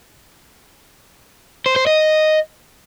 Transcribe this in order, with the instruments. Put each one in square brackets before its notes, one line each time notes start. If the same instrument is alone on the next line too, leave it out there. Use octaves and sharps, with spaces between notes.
[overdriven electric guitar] C5
C5
D#5